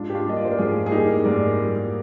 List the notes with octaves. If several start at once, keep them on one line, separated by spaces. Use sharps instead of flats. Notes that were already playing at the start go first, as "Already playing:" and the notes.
Already playing: G#2 D4 F4
G4
D4 F4
G3 A#3 D#5
D5
C5
A#4
G#2 F4 G#4
G#4
G3 A#3 D#4 G4
G#2 A#4 D5
G3 A#3